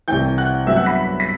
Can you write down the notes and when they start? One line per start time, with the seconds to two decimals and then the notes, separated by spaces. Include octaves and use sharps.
0.08 C2 C3 E3 G5 G6
0.38 F#5 F#6
0.67 G2 F#3 B3 E5 E6
0.76 F#5 F#6
0.86 B5 B6
1.20 B6